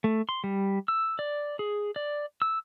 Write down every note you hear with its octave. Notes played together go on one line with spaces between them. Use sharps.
A3
C6
G3
E6
D5
G#4
D5
E6